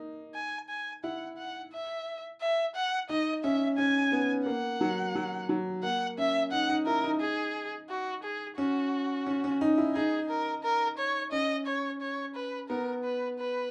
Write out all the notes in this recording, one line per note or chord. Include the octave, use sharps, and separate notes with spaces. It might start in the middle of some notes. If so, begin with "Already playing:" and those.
Already playing: A#3 D#4
G#5
G#5
E4 F#5
F#5
E5
E5
F#5
D#4 D#5
C#4 E5
C#4 G#5
B3
A#3 F#5
F#3
F#3
F#3
A#3 F#5
C#4 E5
D#4 F#5
D#4
E4 A#4
D#4
G#4
F#4
G#4
C#4 F#4
C#4
C#4
D#4
E4
D#4 G#4
A#4
A#4
C#5
C#4 D#5
C#5
C#5
B4
B3 A#4
B4
B4